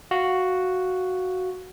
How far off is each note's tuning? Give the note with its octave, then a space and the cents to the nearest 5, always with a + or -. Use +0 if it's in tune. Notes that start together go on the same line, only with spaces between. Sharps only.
F#4 +0 F5 +0